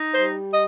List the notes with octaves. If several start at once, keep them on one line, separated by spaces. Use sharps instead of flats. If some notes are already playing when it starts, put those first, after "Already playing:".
Already playing: D#4
G3 C5
D#5